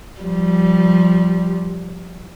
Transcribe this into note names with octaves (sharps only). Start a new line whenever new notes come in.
F3 G3